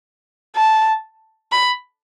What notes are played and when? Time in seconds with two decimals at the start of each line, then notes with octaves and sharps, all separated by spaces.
0.56 A5
1.52 B5